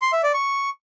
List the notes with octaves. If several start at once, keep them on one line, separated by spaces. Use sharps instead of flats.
C6
E5
D5
C#6